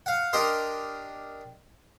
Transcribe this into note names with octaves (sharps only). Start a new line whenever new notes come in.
F5 F#5
D4 G4 A#4 D#5 C6